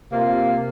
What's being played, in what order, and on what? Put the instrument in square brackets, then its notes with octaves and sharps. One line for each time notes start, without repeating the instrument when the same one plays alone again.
[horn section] C3 A#3 F4